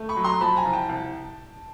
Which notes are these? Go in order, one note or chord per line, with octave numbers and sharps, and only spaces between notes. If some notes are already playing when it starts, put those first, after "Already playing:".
Already playing: A3
B5 C#6
F#3
A#5 C6
F3 A5 B5
G#5 A#5
C2
G5 A5
C2